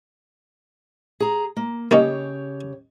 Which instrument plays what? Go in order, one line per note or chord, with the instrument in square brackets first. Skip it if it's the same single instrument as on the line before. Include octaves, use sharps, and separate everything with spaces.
[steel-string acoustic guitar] G#4 A#5
A#3
[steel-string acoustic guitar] C#3 G4 C#5 [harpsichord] A#3 C#4 D#4